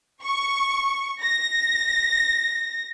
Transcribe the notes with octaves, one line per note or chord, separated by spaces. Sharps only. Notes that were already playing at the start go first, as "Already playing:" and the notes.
C#6
A#6